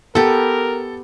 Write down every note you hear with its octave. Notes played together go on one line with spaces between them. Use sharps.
B3 G4 A4 A#4